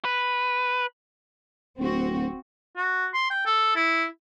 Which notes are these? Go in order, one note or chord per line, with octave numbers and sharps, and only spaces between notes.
B4
D1 C4 F#4
F#4
C6
G5
A4
E4